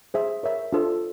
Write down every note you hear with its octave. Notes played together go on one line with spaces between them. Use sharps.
G#4 C5 E5
A#4 C#5 E5
D4 F4 A4 C5